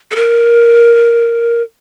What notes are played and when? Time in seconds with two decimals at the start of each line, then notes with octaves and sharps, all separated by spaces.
0.11 A4
0.16 A#4